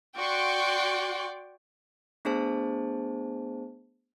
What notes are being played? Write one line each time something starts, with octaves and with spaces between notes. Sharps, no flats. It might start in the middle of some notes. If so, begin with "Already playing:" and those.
F#4 D5 G5 C6 C#6
A3 B3 D4 G#4 C5 A5